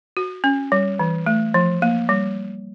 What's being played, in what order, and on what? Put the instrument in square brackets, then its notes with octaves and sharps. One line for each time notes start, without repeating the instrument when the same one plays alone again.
[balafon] F#4
C#4
G3
E3
A3
F3
A#3
G3